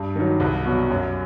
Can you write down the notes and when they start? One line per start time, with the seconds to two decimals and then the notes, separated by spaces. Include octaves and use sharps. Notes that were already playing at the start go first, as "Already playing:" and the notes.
Already playing: G2
0.16 D#3 F#3
0.40 C2
0.65 B2 F#3
0.90 F#2